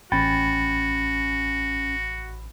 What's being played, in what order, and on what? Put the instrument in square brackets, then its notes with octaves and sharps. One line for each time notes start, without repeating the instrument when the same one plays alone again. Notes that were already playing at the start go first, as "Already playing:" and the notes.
[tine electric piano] A1 B5 A6 [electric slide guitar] C#4 G5 [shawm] F#4